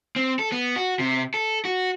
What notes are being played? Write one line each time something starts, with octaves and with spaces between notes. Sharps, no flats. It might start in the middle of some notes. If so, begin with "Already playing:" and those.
C4
A4
B3
F#4
C3
A4
F#4